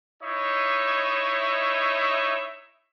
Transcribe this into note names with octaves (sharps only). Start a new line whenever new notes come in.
D#4 E4 C#5 D#5 E5